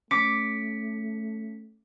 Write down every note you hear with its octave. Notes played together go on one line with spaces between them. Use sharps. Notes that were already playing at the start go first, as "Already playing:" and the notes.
A3 C#4 D6 B6 C#7